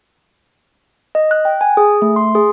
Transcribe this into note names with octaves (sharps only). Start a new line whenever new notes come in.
D#5
F#6
G5
G#5
G#4
A3
C6
G#4